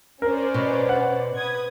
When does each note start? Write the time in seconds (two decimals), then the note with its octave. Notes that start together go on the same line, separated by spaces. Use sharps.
0.22 C#4 A#4 C5 D5
0.54 B2
0.89 F#5
1.35 B4 D#6 G#6